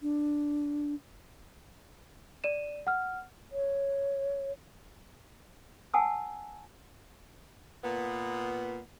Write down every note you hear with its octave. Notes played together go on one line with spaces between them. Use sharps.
D4
D5 D#7 E7
F#5 F6
C#5
F#5 G#5 A5 D#6 E6
A#2 B3